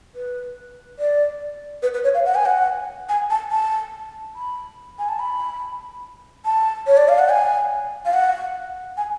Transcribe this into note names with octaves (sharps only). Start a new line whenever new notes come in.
B4
D5
B4
B4
C#5
F5
F#5
G#5
F#5
G#5
A5
A5
B5
G#5
A5
B5
A5
C#5
D5
F5
F#5
G#5
F5
F#5
G#5